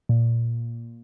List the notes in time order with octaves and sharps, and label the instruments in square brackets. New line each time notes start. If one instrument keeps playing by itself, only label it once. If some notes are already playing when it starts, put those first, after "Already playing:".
[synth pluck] A#2